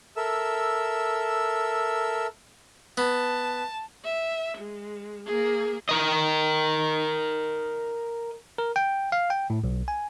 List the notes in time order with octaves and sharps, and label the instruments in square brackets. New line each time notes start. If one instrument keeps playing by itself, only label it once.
[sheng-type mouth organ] A4 A#4 E5 E6
[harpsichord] B3 [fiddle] A5
[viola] E5
G#3
A#3 G#4
[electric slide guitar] A#4 D#5
[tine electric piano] A#4
G5
F5
G5
A2
B1
G#5